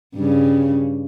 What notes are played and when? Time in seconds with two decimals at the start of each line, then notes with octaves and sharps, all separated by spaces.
0.15 G2 C#3